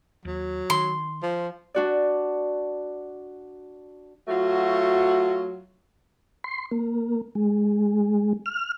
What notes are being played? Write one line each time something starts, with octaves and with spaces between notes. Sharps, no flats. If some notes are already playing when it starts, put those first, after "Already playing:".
D#2 F#3
D#3 C6
F3
D4 F#4 D5
F#3 A3 F4 F#4
C6
A#3
G#3
F6